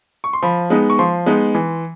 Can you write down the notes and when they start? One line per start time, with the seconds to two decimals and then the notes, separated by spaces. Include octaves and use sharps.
0.24 C#6
0.33 C6
0.42 F3 B5
0.70 G#3 B3 D#4
0.90 C#6
0.99 F3 C6
1.26 G#3 B3 D#4
1.55 E3